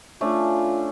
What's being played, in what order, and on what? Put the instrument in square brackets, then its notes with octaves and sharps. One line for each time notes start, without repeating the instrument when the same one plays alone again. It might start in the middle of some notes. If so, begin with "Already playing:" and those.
[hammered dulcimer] A3 C#4 D4 [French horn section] F4